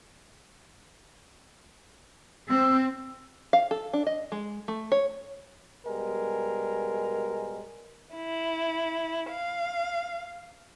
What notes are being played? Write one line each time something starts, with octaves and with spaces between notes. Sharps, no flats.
C4 E6
F5
A4
D4
D#5
G#3
A3
C#5
B2 G3 G#3 A#4
E4
F5